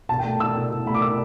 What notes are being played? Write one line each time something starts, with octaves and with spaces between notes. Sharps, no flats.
B2 A5
G5
A3
E4 E6
B2
B2
A3 B5
D6
E4 E6